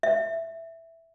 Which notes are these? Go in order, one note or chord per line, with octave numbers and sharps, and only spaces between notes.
E5